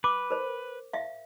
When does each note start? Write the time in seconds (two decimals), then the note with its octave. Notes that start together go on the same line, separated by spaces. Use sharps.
0.04 B4 D6
0.31 A#4 C5
0.93 E5 F5